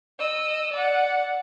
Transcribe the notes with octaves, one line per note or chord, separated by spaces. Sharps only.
D#5 E6
D5 F#5